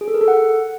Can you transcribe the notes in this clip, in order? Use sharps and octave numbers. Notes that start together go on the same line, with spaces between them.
G#4
A4
A#4
A4
F#5